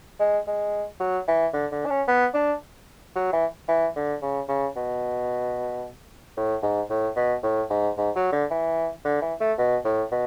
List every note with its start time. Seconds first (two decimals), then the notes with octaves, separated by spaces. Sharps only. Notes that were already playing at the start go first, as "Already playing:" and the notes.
0.20 G#3
0.47 G#3
1.00 F#3
1.28 E3
1.54 D3
1.72 D3
1.86 D4
1.90 C#4
2.08 B3
2.34 D4
3.16 F#3
3.33 E3
3.68 E3
3.96 D3
4.22 C#3
4.48 C#3
4.76 B2
6.37 A2
6.63 G#2
6.90 A2
7.16 B2
7.43 A2
7.70 G#2
7.98 G#2
8.15 F#3
8.32 D3
8.51 E3
9.05 D3
9.22 E3
9.40 A3
9.58 B2
9.85 A2
10.12 B2